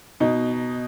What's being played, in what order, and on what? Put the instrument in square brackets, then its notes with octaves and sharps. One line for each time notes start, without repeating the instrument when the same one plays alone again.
[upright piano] B2 D#4